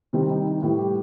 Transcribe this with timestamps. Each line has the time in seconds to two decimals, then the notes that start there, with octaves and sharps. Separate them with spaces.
0.13 C3 D#3 G3 C4
0.30 D#4
0.45 D#4
0.62 A2 E3 G3 E4
0.79 G4